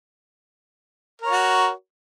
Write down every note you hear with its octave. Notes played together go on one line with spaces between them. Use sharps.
F#4 A#4 C#5